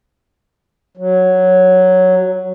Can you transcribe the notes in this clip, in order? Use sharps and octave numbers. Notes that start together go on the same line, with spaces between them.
F#3